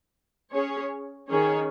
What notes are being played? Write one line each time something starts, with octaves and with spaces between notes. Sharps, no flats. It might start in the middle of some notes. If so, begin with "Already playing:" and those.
C#4 G#4 C#5
D#3 C#4 G#4 C#5